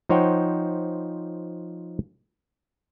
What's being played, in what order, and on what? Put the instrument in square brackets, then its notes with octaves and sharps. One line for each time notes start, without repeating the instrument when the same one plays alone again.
[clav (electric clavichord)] F3 D#4 C5 C#5 F#5 G5